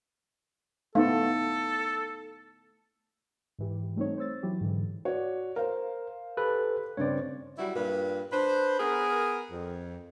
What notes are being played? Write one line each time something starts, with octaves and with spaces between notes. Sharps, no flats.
A3 B3 D#4 A4 F5
G#2 E3 G4
G3 A3 C4 D#4 C#5
C5 C#5 E6 A6
E3 F#3 E4 G4
G#2 D3 E3
F#4 C#5 D5
A#4 C5 F5
G4 A4 B4
G2 C#3 C4 C#5 D5
F#3 G3 E4 F#4
G2 A#2 B4
D4 B4 C5
B3 G#4 A#4
F2